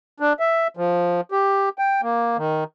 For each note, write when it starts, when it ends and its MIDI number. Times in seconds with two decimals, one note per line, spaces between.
0.20 0.33 62
0.40 0.67 76
0.77 1.21 53
1.32 1.69 67
1.78 2.01 79
2.02 2.37 58
2.37 2.64 51